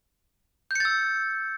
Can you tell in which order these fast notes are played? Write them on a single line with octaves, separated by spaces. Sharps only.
G6 C#7 A6 E6